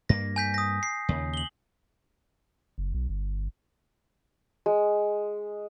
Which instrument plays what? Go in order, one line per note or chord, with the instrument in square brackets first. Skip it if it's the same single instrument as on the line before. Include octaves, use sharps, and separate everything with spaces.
[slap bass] G2 A#3 [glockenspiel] A#6
[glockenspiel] G#5 G6 B6
D#6 A#6
C7
[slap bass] D#2 C#3
[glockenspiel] F#7 G7
[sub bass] F#1
B1
G1
[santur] G#3